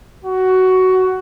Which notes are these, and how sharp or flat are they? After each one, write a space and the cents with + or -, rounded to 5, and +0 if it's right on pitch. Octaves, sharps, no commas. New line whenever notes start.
F#4 +15